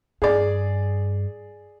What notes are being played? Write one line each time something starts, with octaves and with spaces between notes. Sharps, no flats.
G2 G#4 D5